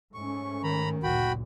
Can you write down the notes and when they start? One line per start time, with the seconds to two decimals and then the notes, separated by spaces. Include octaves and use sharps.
0.14 G#2 A3 C#4 C#6
0.64 D#3 A#5 B5
1.03 F#1 D2 A#2 F#4 G5 B5